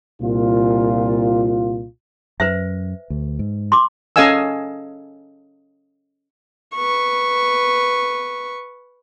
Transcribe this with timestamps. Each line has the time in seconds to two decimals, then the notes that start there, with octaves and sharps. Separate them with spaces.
0.22 C2 A#2 F4
2.40 F#2 B4 C5 E5
3.10 D2
3.39 G#2
3.72 C6 D6
4.16 C#4 A4 D#5 F5 G#5 E6
6.76 B4 C#6